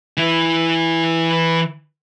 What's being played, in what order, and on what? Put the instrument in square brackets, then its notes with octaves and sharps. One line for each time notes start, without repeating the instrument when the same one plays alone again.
[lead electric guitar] E3 E4